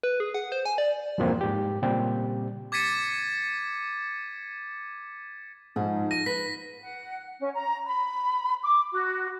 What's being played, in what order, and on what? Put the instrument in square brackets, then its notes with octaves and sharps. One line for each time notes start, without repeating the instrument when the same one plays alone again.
[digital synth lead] B4
G#4
F#5
C5
G#5
D5
[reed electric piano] E2 G2 B2 F3 A#3 C4
G#2 G4
A#2 C#3 G3 C4 G4
[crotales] D6 G#6 A6 B6 C#7 D#7
[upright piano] G#2 [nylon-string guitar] F3 [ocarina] D#4
[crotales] A#6 [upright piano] D#7
[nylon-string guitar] B4 [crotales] B6
[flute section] F#5
C#4
A#5
B5
D6
F#4